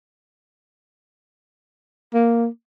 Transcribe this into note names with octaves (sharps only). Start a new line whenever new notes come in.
A#3